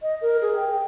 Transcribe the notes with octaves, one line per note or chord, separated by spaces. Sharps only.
D#5
A#4
G#4
G5